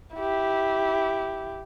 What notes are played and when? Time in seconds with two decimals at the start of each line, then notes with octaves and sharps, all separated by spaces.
0.15 E4 G4